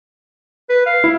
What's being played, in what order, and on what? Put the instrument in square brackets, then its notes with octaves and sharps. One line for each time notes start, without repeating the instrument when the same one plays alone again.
[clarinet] B4
F5
[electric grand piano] E4